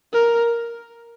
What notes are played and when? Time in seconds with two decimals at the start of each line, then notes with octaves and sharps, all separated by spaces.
0.13 A#4